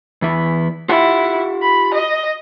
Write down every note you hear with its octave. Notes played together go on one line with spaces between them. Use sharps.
E2 E4
E4 F4 G4 F#5
B5
D#5